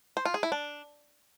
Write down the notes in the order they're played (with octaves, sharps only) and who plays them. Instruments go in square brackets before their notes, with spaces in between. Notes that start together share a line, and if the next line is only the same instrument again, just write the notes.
[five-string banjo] C5
F4
G#4
E4
D4